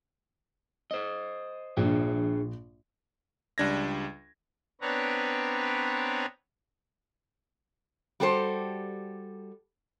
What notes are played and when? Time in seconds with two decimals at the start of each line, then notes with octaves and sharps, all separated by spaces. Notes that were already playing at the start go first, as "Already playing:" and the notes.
0.91 C5 D#5
1.77 A#1 D4 G#4 G5
3.58 C#2 G3 D4 G#6 A#6
4.81 B3 C4 D4 B4 C#5 A#5
8.20 G3 F#4 G4 A4 C5